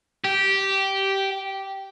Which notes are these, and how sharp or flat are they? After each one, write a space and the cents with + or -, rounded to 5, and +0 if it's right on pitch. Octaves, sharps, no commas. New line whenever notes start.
G4 -10